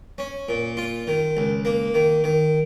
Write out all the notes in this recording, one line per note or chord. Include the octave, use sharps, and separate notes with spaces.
C#4
A#2
F4
D#3
C#2
A#3
D#3
D#3